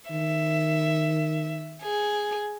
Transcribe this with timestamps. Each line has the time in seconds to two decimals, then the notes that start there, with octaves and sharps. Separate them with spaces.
0.10 D#3 E5
1.82 G#4